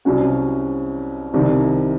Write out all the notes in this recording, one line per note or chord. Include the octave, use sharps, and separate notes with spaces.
C2 C3 F#3 C#4 F#4
C2 C3 D#3